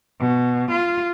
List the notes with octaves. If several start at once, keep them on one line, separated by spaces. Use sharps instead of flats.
B2
F4